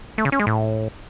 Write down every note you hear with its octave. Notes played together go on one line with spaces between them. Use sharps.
A3
C#3
C#4
G#3
A2